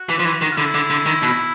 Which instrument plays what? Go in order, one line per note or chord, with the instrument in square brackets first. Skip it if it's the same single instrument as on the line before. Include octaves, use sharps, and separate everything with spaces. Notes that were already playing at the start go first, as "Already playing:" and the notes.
Already playing: [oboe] F#4
[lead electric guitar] E3
F3
E3
D#3
[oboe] F4
[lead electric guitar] D3 [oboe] E4
[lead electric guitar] D3
D3
D#3
B2